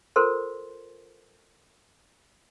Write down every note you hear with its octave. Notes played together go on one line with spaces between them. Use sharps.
F4 A4 A#4 C5 C6